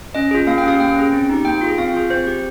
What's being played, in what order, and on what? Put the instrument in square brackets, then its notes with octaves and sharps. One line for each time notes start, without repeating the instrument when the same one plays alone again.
[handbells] C#4 D#5
F4 G#4
A#3 F5
G5
C#4 G4 F5
A#3 G5
C#4 G#4
C4
D#4 G4
A#3 G5
F4 G#4
C4 F5
F4 G#4
C4 C5
G4